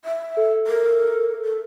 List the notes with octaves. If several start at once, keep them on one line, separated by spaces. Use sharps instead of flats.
E5
A4
A#4
A4